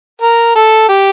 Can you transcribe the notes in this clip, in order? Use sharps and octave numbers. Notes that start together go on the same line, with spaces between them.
A#4
A4
G4